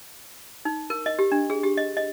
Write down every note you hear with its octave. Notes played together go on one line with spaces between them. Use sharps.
D#4
A#4
D#5
G4
D4
G#4
G4
D#5
D#5